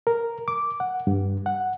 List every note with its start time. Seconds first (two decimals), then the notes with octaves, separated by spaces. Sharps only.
0.07 A#4
0.48 D6
0.80 F#5
1.07 G2
1.46 F#5